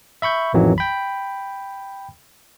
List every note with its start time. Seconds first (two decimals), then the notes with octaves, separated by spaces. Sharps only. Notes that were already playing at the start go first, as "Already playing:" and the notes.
0.22 E5 B5 C#6 G6
0.54 A1 F2 D#3 E3 F#3
0.78 G5 B5